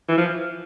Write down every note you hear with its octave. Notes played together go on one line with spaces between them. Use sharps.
E3
F3